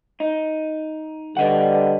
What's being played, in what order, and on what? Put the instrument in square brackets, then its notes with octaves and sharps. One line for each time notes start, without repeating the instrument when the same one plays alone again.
[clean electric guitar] D#4
[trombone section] D3 G3 [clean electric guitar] B4 D#5 F#5